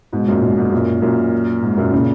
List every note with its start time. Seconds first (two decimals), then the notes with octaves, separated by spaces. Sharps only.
0.13 G#2 B2
0.27 F#2 A#2
0.42 G#2 B2
0.58 G#2
0.72 F#2 A#2
1.02 F#2 A#2
1.62 G#2
1.77 F#2 A#2
1.92 A#2 C#3